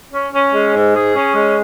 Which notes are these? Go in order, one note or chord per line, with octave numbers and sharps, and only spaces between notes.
C#4
C#4
G#3
G#2
G#4
C#4
G#3